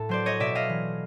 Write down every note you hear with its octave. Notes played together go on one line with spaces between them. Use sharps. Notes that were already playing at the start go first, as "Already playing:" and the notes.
Already playing: A2 A4
F#3 C5 D5
C#5 D#5
B2 D5 E5
D#5 F5
E3